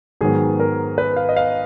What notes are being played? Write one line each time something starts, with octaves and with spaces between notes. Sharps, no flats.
G#2 D#3 F#3 B3 G#4
A#4
B4
F5
D#5
F5